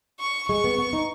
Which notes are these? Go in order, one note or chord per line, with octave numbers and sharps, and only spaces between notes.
C#6
G#3 C#6
B3
B3
D#4